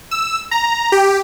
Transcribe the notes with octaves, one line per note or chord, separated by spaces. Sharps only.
E6
A#5
G4